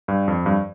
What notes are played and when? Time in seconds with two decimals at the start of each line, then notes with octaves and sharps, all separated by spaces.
0.08 G2
0.28 F2
0.46 G2